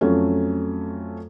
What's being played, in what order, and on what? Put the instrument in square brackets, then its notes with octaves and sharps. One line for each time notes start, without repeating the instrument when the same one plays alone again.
[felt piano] F2 F#3 A3 C#4